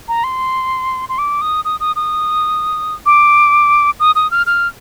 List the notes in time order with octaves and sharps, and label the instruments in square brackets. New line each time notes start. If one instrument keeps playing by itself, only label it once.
[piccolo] A#5
C6
C6
D6
D#6
D#6
D#6
D#6
D6
D#6
D#6
F6
F6